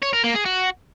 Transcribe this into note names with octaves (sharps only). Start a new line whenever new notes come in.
C#5
A#4
A#3
G#4
F#4